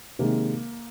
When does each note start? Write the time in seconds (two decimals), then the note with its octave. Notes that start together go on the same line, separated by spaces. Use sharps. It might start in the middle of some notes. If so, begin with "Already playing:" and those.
0.19 C3 D#3 G#3 A#3